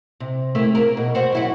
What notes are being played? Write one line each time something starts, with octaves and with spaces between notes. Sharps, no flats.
C3
A3 A#3 E4
A#3 A#4
B2
F#4 C5
F#2 E4 F#4